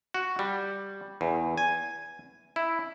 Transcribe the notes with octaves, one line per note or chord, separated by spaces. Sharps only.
F#4
G3
E2
G#5
E4